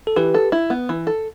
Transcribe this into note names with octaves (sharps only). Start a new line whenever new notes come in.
A4
E3 G4 B4
A4
E4
B3
E3
A4